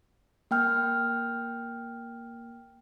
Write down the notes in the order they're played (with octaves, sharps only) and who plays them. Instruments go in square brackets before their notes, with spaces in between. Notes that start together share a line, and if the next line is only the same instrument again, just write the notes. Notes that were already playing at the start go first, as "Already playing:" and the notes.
[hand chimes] A#3 G5 F6